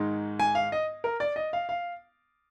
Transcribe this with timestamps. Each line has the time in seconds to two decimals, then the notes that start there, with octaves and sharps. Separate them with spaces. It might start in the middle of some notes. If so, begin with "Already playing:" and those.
Already playing: G#2 D#3 G#3 D#4
0.40 G#5
0.55 F5
0.72 D#5
1.04 A#4
1.20 D5
1.36 D#5
1.53 F5
1.69 F5